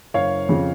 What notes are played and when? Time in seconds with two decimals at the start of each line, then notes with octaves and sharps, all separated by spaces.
0.14 F#1 C#5 F5
0.49 F2 C#3